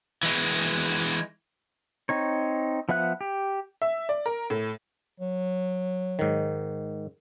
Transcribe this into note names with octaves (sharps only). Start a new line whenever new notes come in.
E3 G#3
C4 D#4 C#5
F3 B3 E5 F#5 F#6
G4
E5
D5
A#4
A2
F#3
G#2 D#3